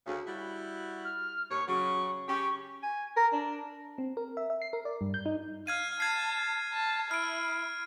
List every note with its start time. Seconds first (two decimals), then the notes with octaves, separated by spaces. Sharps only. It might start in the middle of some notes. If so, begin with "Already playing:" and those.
0.06 D2 C#3
0.27 G3 E4 F#4
1.04 F6
1.50 D#2 C#5 C#6
1.68 C#3 F#3 C#6
2.28 C#3 C#4 G4 C#6
2.83 G#5
3.17 A#4
3.32 D4
3.98 C4
4.17 A#4
4.37 E5
4.50 E5
4.62 C7
4.73 A#4
4.85 D5
5.01 G2
5.14 G6
5.26 D#4
5.67 F5 F6 G#6 D#7
6.00 A5 G#6 C7
6.73 A5
7.11 E4 F6 D7